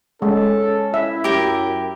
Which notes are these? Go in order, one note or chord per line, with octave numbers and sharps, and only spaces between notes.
G#3 C#4 A4
E4 E5
F#2 G4 A#4